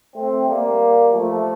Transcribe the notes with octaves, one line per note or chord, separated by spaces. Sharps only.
A3 C4
G3 A#3
F3 A3